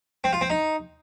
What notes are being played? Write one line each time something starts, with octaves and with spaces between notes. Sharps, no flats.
C4
F4
C4
D#4